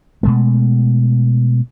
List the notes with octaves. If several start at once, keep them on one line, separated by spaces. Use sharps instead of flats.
B2 G#3 A3